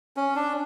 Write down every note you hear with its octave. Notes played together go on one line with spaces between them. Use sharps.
C#4
D4